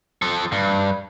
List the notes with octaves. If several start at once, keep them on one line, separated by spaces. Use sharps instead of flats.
F3 A4
G2